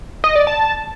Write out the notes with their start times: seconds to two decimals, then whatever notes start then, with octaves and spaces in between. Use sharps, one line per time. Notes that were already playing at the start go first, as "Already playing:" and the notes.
0.24 D#5
0.35 D5
0.47 A5